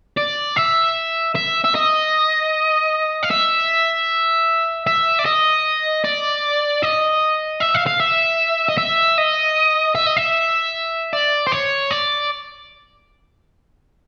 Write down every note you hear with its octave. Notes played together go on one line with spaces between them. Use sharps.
D5
E5
E5
E5
D#5
F5
E5
E5
D5
D#5
D5
D#5
E5
F5
F5
E5
D#5
E5
D#5
E5
D#5
E5
D5
C5
C#5
D5